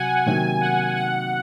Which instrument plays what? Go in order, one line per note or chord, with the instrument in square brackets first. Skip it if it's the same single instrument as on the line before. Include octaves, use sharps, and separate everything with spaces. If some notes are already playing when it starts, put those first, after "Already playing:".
Already playing: [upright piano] C3 F#3 [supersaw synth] F#5 G#5
[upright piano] C3 D#3 F#3 A#3 [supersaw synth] G#5
[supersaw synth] F#5
F#5